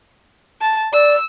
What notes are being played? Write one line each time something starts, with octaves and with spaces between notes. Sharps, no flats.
A5
D5 E6